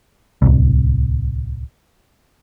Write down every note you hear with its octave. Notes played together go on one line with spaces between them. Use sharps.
D1 C2